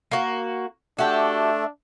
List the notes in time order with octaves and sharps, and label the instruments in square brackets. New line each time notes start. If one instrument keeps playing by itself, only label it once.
[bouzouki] A#3 F#4
[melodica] A3 [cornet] D4 [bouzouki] F#4 G4 [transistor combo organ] E5